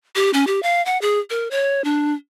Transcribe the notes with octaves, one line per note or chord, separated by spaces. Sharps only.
G4
C#4
G4
F5
F#5
G#4
A#4
C#5
D4